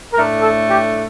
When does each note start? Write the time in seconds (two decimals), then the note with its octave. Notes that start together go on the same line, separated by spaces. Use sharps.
0.13 A2 A3 D4 A#4
0.42 A4
0.70 G4